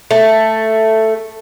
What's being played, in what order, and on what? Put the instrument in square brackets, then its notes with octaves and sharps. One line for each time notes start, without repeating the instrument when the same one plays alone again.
[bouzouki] A3